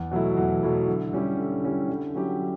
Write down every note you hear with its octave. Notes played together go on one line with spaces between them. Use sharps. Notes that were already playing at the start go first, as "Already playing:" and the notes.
Already playing: E2
B2 F#3 A3 E4
E2
B2 F#3 A3 E4
D3
G3 C#4 E4 G4
D3
G3 C#4 E4 G4
D3
F#3 C#4 E4 G4
D3